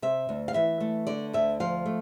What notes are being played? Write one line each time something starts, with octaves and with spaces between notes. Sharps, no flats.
C3 E5
D2
F5
E3 E5
A3
D3 D5
D2 E5
F3 F5
A3